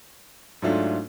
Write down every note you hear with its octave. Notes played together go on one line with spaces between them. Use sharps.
G#2 F#3 A3 D4 F4